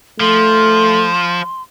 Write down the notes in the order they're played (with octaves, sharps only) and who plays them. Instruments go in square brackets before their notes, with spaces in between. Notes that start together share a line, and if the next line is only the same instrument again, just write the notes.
[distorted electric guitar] F3 [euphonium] A3 [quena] C6